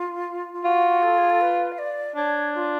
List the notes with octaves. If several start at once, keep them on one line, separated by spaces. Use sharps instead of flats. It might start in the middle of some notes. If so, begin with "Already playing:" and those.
Already playing: F4
F4
F4 F#4
A4
G#4
A4
B4
F5
D5
D4 C#5
F4